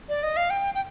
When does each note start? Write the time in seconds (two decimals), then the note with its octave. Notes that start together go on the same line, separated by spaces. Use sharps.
0.09 D5
0.23 D#5
0.37 F5
0.50 G5
0.75 G5